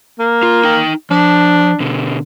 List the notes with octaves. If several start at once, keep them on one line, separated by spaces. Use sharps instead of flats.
A#3
F4
D#4 G5
F3 D4
B2 D3